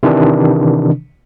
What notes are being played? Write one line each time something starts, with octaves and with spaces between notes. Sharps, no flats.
C3 D#3 E3 D4